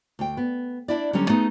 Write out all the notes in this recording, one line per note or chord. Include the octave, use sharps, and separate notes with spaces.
D2 G5
B3
D4 E4 D5
D3 F#3 G3 C#4
A3 B3 D#4 G#4